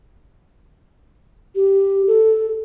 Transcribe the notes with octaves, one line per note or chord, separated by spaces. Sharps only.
G4
A4